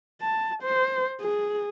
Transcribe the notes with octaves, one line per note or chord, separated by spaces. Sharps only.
A5
C5
G#4